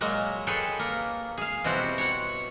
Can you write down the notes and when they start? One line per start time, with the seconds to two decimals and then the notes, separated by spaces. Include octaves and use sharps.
0.01 A#2 F#3 G#3 A#3
0.47 G#4 A4 B4 C#5 G5
0.79 A#3
1.38 G#4 F5
1.64 B2 G3 C4 E4 F#4 C#5
1.98 C#5 F#5